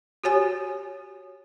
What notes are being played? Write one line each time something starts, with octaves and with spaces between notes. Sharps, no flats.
F#4 G4 C#5 G#5